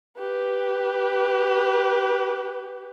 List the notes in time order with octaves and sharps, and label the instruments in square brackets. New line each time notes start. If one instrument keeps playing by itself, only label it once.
[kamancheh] G4 B4